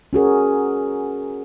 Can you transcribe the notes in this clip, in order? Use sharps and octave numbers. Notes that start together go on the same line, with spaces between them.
C#4 F#4 G#4 A#4